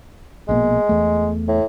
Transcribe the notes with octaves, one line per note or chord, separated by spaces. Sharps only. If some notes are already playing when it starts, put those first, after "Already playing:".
A#1 B2 G#3 A#3
E2 A3
A2